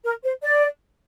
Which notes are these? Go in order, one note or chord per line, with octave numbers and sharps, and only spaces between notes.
A#4
C5
D5